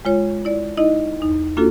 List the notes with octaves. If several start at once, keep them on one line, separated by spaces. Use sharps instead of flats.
G#3 F4 C#5
E4 D5
D#4 E4 D#5
E2 D#4
A#3 D4 F4 F#4 A4